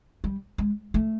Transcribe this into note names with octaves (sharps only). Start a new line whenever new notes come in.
G3
G#3
A3